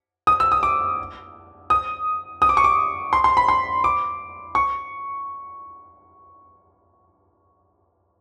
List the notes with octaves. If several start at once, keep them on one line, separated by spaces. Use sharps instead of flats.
D#6
E6
D#6
D6
D#6
D#6
D6
C#6
D6
C6
C6
B5
C6
D6
C#6